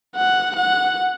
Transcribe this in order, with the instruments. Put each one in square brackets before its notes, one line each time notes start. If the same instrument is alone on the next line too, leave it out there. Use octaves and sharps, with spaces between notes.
[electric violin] F#5
F#5